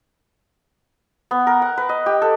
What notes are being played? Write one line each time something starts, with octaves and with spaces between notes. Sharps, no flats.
B3
A#4
F#5
B4
D#5
G4
A4